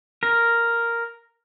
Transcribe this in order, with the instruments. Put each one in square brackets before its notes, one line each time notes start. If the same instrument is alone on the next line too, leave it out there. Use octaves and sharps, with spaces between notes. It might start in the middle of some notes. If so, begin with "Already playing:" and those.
[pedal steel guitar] A#4